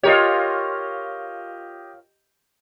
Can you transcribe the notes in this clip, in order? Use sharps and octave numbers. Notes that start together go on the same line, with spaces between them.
F4 G4 A#4 C#5 D#5